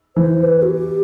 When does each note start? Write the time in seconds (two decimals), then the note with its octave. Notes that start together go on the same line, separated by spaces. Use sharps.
0.16 E3 C5
0.43 B4
0.63 F#4
0.70 G4